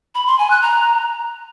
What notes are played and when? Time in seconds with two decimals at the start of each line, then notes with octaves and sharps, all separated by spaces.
0.15 B5
0.27 C6
0.39 G#5
0.50 F#6
0.62 A#5